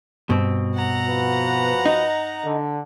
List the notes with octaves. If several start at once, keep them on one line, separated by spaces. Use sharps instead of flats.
G2 B2 C4
F#5 A#5
F3 F#4 B4
D#4
D3